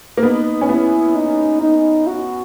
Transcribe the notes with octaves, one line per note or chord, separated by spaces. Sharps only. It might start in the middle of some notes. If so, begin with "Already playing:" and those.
A#3
B3 D#4
C#4
B3 E4
D#4
D#4
F#4